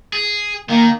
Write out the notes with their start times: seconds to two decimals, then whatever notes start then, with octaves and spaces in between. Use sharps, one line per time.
0.13 G#4
0.70 D#3 A#3